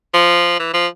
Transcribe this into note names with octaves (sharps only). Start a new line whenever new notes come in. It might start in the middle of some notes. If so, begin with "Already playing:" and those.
F3
E3
F3